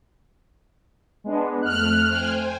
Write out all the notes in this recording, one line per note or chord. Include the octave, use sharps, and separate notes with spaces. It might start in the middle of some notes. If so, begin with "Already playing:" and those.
G#3 B3 D4
F2 A3 F6 F#6
C5 G5 G#5